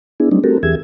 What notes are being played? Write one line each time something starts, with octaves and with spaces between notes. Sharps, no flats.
B3 D4 E4 G#4
F#3 G3 A3 C4 D4 D#4
A3 C4 F#4 G4 A4 A#4
E2 E3 G4 G#4 E5 G#6